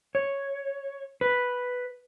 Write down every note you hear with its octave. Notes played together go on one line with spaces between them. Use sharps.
C#5
B4